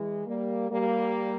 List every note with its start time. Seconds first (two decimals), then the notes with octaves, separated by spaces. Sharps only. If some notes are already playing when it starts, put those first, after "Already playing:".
Already playing: E3 G#3
0.26 G3 A#3
0.70 G3 A#3